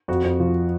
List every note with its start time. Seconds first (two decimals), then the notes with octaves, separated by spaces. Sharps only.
0.08 F2 F#4
0.24 F2
0.40 F3